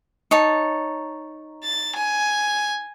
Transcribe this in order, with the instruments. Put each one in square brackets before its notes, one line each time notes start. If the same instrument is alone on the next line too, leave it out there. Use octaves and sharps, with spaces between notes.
[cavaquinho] D#4 C#5 A5
[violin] A6
G#5